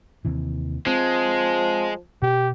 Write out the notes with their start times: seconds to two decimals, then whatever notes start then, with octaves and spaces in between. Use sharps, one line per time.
0.25 D#2 C3 E3
0.87 F3 G#3 C4
2.22 B2 G4